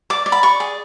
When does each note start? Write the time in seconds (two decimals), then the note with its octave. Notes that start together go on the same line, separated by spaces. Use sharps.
0.10 D5 D6
0.26 D5
0.32 B5
0.43 D5 C#6
0.60 G#4